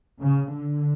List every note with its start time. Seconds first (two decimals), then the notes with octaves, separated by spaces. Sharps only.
0.21 C#3
0.50 D3